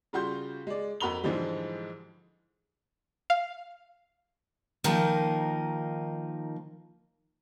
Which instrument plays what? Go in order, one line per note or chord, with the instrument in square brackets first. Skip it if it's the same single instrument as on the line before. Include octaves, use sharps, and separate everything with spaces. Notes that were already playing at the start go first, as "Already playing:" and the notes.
[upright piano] C#3 G3 F4 F#4 C6 G6
G#3 D5
F2 F#4 A#4 B5 F7 G7
G#2 D3 E3 F3 G3 G#3
[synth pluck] F5
[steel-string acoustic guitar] D#3 F3 A#3 D#4